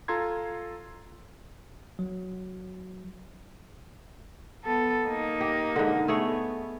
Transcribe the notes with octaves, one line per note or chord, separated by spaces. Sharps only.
F4 A4 A#5 C6 G#6
F#3
B3 A4
A#3 D#4
G4
G#2 D3
A3 B3 G#4 C#5